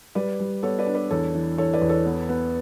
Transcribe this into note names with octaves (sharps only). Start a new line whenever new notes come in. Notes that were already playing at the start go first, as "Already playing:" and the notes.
G3 B4 D5
G3
B3 A4 C#5
B4 D5
D4
B4 D5
E2 A4 C#5
E3
E3 A4 C#5
B4 D5
E2
A4 C#5
B3
B3